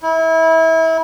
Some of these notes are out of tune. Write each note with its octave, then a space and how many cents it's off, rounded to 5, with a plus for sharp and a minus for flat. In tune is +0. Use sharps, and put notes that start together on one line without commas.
E4 -30